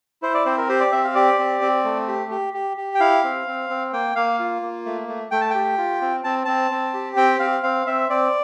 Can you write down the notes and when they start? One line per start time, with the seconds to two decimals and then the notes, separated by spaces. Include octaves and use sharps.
0.22 E4 C5
0.34 D5
0.46 C4 C5
0.58 A#4
0.69 G4 C5
0.80 D5
0.92 C4 E5
1.04 F5
1.15 G4 D5
1.39 C4
1.62 C4
1.84 A3
2.08 G4
2.31 G4
2.54 G4
2.77 G4
2.95 G5
3.00 E4 F5
3.24 C4
3.47 C4
3.70 C4
3.93 A#3 G5
4.15 A#3 F5
4.39 F4
4.62 A#3
4.86 A3
5.08 A3
5.31 A3 G5
5.41 A5
5.50 G4 G5
5.78 F4
6.02 C4
6.24 C4 A5
6.45 C4 A5
6.71 C4
6.94 G4
7.16 C4 G5
7.39 C4 F5
7.63 C4 F5
7.86 C4 E5
8.09 C4 D5